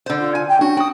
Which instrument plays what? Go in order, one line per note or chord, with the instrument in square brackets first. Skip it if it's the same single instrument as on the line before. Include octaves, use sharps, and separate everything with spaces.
[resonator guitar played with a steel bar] D3 C5
[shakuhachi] F4
[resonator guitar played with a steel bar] G#5
[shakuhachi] G5
[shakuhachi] C#4 [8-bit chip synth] D4 [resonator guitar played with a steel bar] F#4
[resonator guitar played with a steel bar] F#4 [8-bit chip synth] G5 D#6